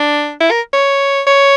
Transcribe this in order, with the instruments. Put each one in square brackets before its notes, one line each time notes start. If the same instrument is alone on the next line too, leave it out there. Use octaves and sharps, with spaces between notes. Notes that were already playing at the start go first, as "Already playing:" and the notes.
Already playing: [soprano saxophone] D4
E4
A#4
C#5
C#5